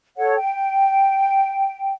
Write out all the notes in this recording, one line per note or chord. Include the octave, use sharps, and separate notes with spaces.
A4 C#5 F#5
G5